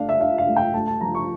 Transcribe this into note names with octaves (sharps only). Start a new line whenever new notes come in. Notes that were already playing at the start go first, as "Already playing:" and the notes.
Already playing: A3 D4 F5
E5
D4 F5
F5
A3
G5
A3 A5
A5
F3 A#5
C#6